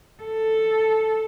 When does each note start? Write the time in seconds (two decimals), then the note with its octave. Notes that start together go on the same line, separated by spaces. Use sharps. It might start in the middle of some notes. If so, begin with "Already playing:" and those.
0.24 A4